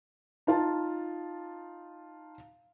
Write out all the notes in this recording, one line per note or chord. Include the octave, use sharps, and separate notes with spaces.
D#4 F4 A5